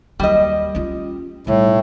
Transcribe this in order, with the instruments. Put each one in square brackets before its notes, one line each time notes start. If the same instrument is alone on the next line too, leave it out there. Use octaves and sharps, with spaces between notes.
[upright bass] D#2 F#3 [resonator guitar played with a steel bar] G3 D#5
[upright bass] C#4 F4
[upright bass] B1 G3 [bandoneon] A2